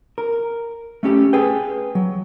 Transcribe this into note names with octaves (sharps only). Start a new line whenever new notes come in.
A#4
A3 C#4 G4
G#4 B4 G5
F#3